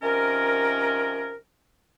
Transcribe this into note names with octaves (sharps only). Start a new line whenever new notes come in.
C3 D#3 F3 C#4 A#4